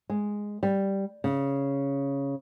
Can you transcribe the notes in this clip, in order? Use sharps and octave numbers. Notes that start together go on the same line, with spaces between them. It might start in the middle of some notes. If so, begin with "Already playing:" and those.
G#3
G3
C#3